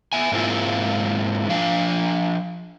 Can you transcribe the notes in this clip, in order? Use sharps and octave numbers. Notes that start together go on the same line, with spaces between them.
B3 E5 G#5
G#2 G#3 A#3 C4 E4 F4
F3 D4 F5